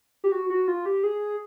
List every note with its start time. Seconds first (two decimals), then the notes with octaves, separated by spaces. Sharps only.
0.24 G4
0.32 F#4
0.50 F#4
0.68 F4
0.86 G4
1.04 G#4